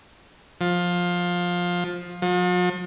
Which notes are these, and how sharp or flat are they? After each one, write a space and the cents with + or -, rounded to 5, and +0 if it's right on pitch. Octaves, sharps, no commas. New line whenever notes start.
F3 +15
F3 +45